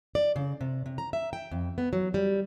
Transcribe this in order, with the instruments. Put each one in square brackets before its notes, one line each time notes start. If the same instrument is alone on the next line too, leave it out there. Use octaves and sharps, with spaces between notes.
[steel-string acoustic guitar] D5
C#3
C3
C3
A#5
E5
G5
F2
B3
F#3
G3